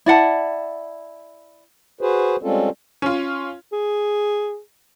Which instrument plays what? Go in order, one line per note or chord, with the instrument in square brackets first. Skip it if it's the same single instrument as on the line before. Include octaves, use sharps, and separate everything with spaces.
[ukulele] E4 D5 F#5 A5
[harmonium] F#4 G#4 B4 C5
G3 G#3 C4 C#4 F4 A4
[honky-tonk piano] C#4 F4
[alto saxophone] G#4